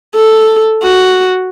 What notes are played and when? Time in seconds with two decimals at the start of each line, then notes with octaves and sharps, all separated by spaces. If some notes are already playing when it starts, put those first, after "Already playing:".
0.15 A4
0.83 F#4